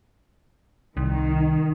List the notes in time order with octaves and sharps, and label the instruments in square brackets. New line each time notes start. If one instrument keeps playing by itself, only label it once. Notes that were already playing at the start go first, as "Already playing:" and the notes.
[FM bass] C2 [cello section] D#3